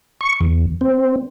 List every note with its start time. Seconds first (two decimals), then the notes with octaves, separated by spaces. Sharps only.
0.21 C#6
0.41 E2
0.81 C4